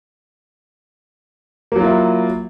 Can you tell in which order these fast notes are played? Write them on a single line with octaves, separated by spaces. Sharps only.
A#3 F#3 F4 E4